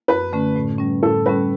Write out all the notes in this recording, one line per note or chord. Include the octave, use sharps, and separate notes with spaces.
F#2 B4
D3 A3 C#4
A2
G3 C#4
A2 A4
G3 C#4 B4